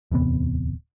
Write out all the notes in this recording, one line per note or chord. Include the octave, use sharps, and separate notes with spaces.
D1 E2 C3 B3